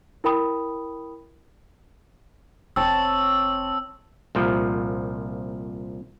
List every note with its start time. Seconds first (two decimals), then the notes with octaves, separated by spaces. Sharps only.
0.24 E4 A#4 G5 B5 D#6
2.76 F1 C4 C#5 A5 E6
4.35 C2 A#2 F3